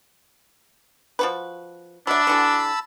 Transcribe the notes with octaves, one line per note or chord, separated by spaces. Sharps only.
F3 F#4 B4
F#3 D4 E5 A5 B5 E6
D3 E3 F#4